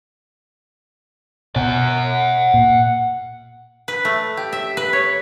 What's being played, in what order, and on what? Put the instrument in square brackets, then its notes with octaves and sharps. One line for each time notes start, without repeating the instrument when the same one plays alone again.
[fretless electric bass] B2 [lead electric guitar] F#5 G#5
[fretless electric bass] A#2
[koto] B4
A3
G4
E5
B4
C#5